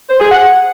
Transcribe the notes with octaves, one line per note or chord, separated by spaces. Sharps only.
C5
G#4
F#5